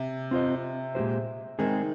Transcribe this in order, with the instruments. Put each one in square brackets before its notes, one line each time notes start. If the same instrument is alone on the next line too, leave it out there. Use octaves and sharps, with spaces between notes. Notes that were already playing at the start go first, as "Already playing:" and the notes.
Already playing: [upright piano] C3
[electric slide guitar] C4 F4 C5 D#5
A#2 G#3 D#4 G4 C5
[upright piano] D#3 [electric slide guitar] G#3 C4 D#4 G#4